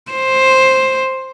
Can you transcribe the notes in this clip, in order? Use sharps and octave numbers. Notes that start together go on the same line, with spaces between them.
C5